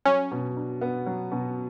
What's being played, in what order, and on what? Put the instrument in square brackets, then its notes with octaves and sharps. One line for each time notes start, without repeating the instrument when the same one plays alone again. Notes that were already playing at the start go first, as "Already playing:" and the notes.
[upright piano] F#3 [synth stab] C#4
[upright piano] B2
D4
B3
F#3
B2